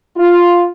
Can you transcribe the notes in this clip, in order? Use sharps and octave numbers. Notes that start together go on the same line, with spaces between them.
F4